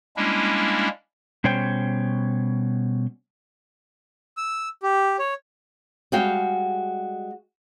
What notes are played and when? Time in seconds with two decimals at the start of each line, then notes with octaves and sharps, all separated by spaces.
0.17 G3 G#3 A#3 C#4 D4 E4
1.44 B2 G3 C#4 C5 C#5 G5
4.37 E6
4.83 G4
5.19 C#5
6.12 G3 G#3 F#4 F5 G5